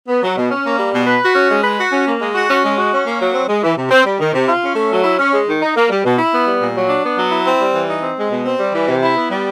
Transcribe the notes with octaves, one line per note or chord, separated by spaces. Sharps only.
B3
F#3
B2
C#4
A#3
G3
B2
B4
F#4
C#4
G#3
B4
F#4
C#4
A#3
G#3
F#4
C#4
G#3
F#4
C#4
A#3
F#3
C4
G#3
E3
C3
C4
G3
D#3
C3
F4
C#4
A3
F#3
E4
C#4
G#3
D#3
D#4
A#3
G3
B2
E4
B3
G3
A#2
F#3
D4
B3
F#3
E4
C4
G3
E3
D#4
C4
G#3
B2
C4
G3
E3
C3
E4
B3
G3